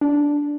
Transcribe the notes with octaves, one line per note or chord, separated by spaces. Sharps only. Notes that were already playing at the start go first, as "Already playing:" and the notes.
D4